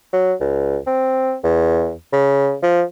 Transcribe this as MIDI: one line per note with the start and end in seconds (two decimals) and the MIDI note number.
0.13 0.33 54
0.40 0.77 37
0.86 1.35 60
1.43 1.93 40
2.12 2.55 49
2.63 2.82 53